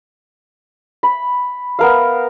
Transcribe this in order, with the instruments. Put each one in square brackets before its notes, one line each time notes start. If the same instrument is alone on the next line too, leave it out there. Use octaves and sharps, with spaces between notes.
[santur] B5
B3 A#4 F5